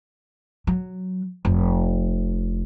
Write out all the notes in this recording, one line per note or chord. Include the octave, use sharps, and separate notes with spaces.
F#3
F1